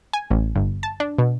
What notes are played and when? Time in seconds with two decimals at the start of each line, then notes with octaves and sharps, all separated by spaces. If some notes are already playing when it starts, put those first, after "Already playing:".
0.13 G#5
0.30 A1
0.56 G1
0.83 A5
1.00 D4
1.18 B2